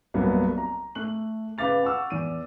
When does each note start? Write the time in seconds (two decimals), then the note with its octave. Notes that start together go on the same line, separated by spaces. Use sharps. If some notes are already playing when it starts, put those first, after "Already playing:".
0.14 C2 G2 F#3 A#3 B3
0.58 A#5
0.95 A3 F#6 F#7
1.58 C#3 B4 F5 D6 A6 F7
1.84 F#5 C#6 E6 F6
2.10 E2 D#7